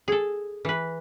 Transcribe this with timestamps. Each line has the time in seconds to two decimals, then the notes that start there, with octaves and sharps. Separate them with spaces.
0.08 G#4 A4
0.65 E3 B4